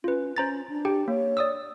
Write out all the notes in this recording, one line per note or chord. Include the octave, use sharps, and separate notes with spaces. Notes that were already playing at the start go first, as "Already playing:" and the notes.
C#4 F4 B4
C#4 C5 A#5 A6
D4
G4 G5
A#3 C#5
D5 D#6 E6